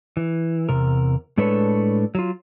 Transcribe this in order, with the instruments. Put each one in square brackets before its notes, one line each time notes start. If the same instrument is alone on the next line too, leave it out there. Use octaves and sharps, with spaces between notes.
[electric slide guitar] E3
E2 C3 A#4
A2 G#3 D4 A4 B4 C#5
F#3 F4